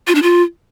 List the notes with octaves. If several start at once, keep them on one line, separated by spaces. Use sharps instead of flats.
F4
D4
F4